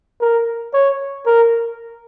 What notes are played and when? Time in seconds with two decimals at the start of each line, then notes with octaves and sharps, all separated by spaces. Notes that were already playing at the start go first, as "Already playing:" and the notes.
0.21 A#4
0.74 C#5
1.26 A#4